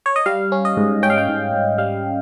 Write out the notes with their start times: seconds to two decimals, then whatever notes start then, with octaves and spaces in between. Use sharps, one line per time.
0.06 C#5
0.16 D#5
0.26 G3 F5
0.52 C#4
0.65 D#5
0.77 G#2
1.03 C#4 G5
1.10 F5
1.18 G5
1.28 G#2
1.53 G#2
1.78 G3 F5